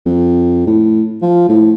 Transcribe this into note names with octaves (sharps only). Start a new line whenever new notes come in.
F2
A2
F3
A2